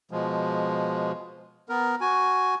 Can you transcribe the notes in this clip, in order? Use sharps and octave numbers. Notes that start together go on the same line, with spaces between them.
B2 F3 G#3
B3 A#4
F#4 G#5